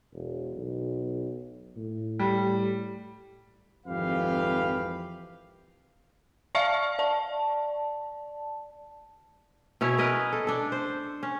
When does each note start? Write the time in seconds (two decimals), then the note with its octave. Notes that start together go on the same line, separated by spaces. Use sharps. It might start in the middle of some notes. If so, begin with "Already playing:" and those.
0.13 E1
0.55 B1
1.77 A2
2.19 G3
3.87 G#1 F2 E3 G4 B4 F5
6.55 D5 E5 F5 A5 C#6 F6
6.99 D5 A5
9.81 B2 C#4 E4 C#5
9.98 A#4 B4 D#5
10.33 A4
10.47 D4 A4
10.72 C5
11.23 C#4